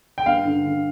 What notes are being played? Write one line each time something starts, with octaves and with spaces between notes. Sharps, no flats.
G5
G2 F5
D3
D3